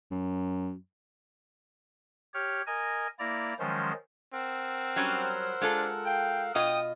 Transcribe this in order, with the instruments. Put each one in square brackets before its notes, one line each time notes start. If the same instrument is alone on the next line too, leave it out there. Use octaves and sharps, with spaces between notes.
[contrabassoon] F#2
[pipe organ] G4 C#5 F6
A#4 D#5 G#5
A#3 E4 D5 A#5
D#3 F3 F#3 G#3 C#4 C5
[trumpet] C4 [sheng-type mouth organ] A#4 F#5 E6
[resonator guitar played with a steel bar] F#3 G3 C#4 [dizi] C5
[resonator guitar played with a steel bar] G#3 F4 A4 [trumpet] D4
[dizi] F5 [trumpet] G5
[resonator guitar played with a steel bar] B2 F4 D#5 [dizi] G5 [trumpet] D#6